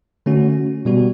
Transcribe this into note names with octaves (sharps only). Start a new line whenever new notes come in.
D3 A3 C#4 F#4
B2 G3 B3 F#4